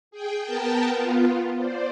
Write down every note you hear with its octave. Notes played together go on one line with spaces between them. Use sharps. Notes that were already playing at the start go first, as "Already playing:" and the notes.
G#4 G5
B3 A#4 G5 A5
B3 F4
C5 D5